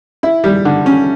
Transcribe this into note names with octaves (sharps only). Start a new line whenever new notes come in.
E4
G3
D3
C#4